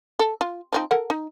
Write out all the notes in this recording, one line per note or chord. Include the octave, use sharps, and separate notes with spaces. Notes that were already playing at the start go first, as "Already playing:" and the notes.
A4
F4
F3 C4 D#4
A4 A#4 F#5
D#4